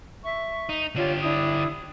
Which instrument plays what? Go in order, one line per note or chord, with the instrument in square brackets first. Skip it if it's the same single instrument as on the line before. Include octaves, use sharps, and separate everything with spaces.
[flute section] E5 C#6
[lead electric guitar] D#4
[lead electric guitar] D3 G4 [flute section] F4 C#5
[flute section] D4 E4 D#6